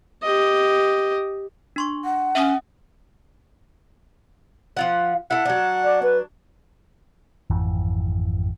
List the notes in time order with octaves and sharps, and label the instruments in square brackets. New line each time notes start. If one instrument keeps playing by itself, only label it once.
[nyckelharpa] G4 D#5
[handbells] D4 C6 C#6
[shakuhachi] F#5
[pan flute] C#4 [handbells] E5 D#6
[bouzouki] F3 F4 F#5
[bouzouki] E4 A4 [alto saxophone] F#5
[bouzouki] F#3 D4
[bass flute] D5
B4
[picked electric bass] G#1 F2 E3